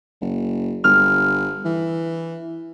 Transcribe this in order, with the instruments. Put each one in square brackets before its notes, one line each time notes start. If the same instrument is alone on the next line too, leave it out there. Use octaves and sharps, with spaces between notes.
[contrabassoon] F#1
[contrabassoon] G1 [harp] F6
[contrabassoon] E3